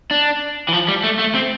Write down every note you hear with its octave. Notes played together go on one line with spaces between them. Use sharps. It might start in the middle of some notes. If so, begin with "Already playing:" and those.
D4
E3
F3
G3
A3
A3
C4